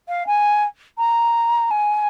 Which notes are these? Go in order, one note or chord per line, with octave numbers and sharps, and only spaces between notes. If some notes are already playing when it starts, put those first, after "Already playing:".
F5
G#5
A#5
G#5